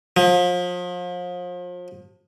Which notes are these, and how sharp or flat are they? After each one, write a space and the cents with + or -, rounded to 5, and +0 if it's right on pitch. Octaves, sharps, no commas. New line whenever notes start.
F3 +35